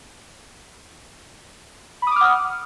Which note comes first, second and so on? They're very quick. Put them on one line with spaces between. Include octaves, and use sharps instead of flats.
B5 D#6 D6 F6 F#5